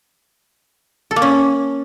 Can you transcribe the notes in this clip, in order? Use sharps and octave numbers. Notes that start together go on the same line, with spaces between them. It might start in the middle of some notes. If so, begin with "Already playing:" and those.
A4
A#3
C#4